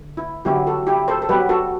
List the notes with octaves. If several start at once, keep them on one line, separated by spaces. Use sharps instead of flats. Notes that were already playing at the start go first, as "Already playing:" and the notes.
Already playing: D3
E4
D3 F#3 B3 E4 G4
F#4 A4
E4 G4
A4 C5
A4
F#3 B3 G4 B4
F#4 A4